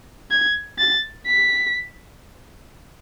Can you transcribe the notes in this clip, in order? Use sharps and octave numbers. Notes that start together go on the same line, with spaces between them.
G#6
A6
B6